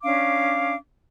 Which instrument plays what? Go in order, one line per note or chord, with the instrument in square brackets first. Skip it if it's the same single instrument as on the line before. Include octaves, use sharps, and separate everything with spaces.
[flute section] C#4 D4 F5 D6